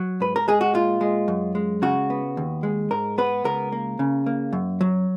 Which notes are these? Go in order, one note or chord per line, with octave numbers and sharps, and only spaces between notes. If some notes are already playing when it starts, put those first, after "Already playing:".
Already playing: F#3
G#2 B4
A#4
G#3 G#4
F#4
A#2 F4
G#3
F#2
G#3
C#3 F#4
B3
D#2
G#3
G#2 A#4
B3 B4
C#2 A#4
A#3
C#3
A#3
F#2
F#3